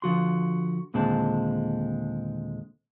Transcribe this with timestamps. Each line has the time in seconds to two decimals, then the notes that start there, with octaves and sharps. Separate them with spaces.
0.02 D3 F3 F#4 C6
0.94 D#2 A#2 D3 G#3 C4 A5